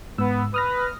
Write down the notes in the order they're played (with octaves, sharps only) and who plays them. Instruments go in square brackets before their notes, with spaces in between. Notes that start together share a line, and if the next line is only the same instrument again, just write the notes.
[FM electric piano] G#2 E6 [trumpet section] B3
[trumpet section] B4 [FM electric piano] D#6 F6 A#6